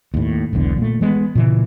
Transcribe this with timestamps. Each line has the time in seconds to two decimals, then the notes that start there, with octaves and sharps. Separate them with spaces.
0.14 D#2 A2
0.53 E1 B1 E2 D3
0.78 A#2 A3
1.01 E3 G#3 A#3 B3
1.35 A#2 C#3 E3